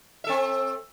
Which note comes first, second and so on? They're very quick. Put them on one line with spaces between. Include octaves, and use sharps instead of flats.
E5 A4 C4